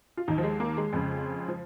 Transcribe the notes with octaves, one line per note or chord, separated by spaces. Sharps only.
F4
D#2 D#3 D#4
F3
G#3
A#3
G#3
F2 C#3
F3